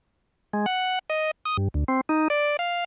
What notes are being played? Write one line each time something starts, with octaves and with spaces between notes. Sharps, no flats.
G#3
F#5
D#5
D#6
G2
D2
C4
D#4
D5
F5